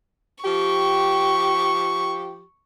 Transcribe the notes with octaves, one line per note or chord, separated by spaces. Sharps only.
F3 G4 C#6